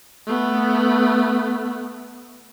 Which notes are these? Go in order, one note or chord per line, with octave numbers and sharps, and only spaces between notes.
A3 B3